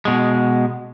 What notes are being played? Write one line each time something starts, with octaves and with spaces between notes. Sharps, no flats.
B2 G#3